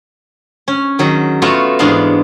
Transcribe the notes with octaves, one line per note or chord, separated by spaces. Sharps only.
C#4
D#3 F#3 G#4
A3 B3 F4 F#4 C#5
E2 G#2 G#3 B3 D4 F5